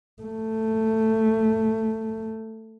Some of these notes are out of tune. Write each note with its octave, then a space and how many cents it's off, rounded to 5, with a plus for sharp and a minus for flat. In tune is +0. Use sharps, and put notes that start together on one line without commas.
A3 +10